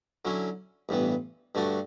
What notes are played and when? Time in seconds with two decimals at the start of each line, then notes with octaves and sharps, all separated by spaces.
0.25 D3 F#3 C#4 E4
0.89 A1 G2 E3 B3
1.55 G2 D3 A3 D4 F#4